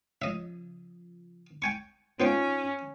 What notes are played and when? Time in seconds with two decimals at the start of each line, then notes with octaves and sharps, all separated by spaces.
0.22 C#3 F3 D#5 E5
1.62 G5 G#5 C#6
2.20 B3 C#4 D#4 F4 C5 G5